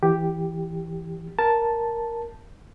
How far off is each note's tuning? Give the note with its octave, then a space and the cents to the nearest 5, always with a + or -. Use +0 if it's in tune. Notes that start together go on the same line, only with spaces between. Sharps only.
E3 +0 G4 +0
A#4 +0 A5 +0